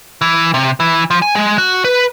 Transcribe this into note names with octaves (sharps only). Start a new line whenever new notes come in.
E3
C3
E3
F3
G#5
G#3
F#4
B4